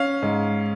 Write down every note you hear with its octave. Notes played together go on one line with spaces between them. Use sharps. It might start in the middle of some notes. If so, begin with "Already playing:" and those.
Already playing: C#4 F5
G#2